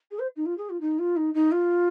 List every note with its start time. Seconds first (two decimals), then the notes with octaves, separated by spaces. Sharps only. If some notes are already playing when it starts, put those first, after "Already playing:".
0.11 G#4
0.19 C5
0.36 D#4
0.45 F4
0.57 G#4
0.69 F4
0.80 D#4
0.99 F4
1.16 D#4
1.34 D#4
1.51 F4